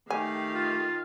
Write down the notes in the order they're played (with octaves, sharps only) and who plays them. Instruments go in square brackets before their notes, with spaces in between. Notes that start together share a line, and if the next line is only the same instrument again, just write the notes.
[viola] D#3 F5 [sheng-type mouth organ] A3 G4 [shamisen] G#5
[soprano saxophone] F4